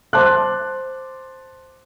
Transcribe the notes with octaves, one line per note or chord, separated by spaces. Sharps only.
C5 A5 C6 D6 F#6